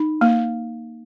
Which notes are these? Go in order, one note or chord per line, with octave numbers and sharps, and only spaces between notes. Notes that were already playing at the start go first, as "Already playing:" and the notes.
Already playing: D#4
A#3